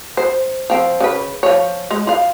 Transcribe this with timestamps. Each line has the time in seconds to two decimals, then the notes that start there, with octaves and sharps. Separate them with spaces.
0.17 C5
0.70 F3 C4
1.00 C#3 B4
1.43 F3 C#5
1.91 G#3
2.07 F4 F5